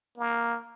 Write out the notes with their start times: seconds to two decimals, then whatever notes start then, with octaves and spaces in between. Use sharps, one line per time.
0.18 A#3